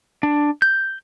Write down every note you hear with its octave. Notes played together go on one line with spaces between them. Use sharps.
D4
G6